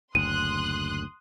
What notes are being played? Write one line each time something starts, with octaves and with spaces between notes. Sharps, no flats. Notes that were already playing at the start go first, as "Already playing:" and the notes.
F#1 D2 C6 D#6 F#6 D#7